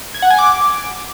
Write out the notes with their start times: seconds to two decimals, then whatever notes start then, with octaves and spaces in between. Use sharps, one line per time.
0.14 G#6
0.22 F#5
0.30 G#5
0.39 D6